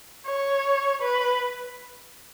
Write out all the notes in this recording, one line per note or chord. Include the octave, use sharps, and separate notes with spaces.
C#5
B4